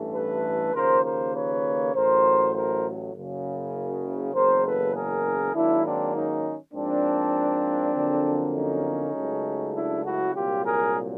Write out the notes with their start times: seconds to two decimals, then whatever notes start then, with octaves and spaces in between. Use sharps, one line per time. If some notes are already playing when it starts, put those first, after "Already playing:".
Already playing: A1 G2 E3 A3
0.13 A4 B4
0.74 D#2 C#3 F3 A#3 A#4 C5
1.04 A#4 C5
1.34 B4 C#5
1.93 A1 A2 F#3 A#4 C5
2.53 A#4 C5
3.14 F#1 F#2 C#3
4.33 F#1 E2 C#3 A#4 C5
4.63 A4 B4
4.94 G#4 A#4
5.53 G#2 D#3 F#3 A#3 D4 E4
5.84 C4 D4
6.13 C#4 D#4
6.73 G#2 F3 A#3 C4 D4
7.94 F2 D3 F#3 A#3
8.54 C#4 D#4
9.14 C#2 C#3 F#3 A3
9.73 D4 E4
10.03 E4 F#4
10.33 C2 A#2 F#3 F4 G4
10.64 G#4 A#4